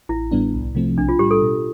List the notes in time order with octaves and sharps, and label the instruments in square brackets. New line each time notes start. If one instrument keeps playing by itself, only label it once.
[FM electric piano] A1 [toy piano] E4
[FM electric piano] A2 G3 B3 D4
C2
C3 F3 A3 C4
[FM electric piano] B1 [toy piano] D4
[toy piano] F4
[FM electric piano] A2 G3 [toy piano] G4
[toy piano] A4
[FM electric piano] B2